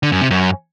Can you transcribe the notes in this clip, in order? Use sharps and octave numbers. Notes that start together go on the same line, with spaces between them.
D3
F#2
C3
F#2